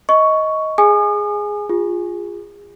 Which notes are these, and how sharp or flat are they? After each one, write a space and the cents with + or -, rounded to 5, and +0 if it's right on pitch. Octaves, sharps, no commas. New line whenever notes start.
D#5 +15 C#6 +5
G#4 +0 G#5 +0 D#6 -40
F4 +0 G#4 -30